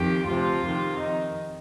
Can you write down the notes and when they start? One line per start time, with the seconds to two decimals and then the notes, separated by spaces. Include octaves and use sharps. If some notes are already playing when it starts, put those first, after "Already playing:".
Already playing: F2 D#3 G4
0.27 D2 C3 F3 F4
0.63 F2 C3 D#3
0.98 F2 D#3 D#4